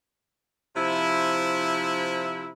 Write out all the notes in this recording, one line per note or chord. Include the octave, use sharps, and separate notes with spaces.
C3 F3 E4